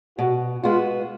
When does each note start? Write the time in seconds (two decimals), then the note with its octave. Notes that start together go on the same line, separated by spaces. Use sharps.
0.18 B2 F#4
0.63 G#3 B3 F4 F#4